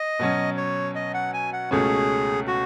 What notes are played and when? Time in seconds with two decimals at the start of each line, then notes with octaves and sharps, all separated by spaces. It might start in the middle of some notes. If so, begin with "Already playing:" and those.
Already playing: D#5
0.19 B2 F#3 C#4
0.57 C#5
0.95 D#5
1.14 F#5
1.33 G#5
1.53 F#5
1.71 C#2 B2 A3 C#4 G#4
2.47 F#4